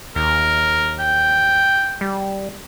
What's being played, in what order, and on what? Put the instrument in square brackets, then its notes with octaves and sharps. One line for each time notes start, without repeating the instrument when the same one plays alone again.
[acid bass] D#2 [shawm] A#4
[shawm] G5
[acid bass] G3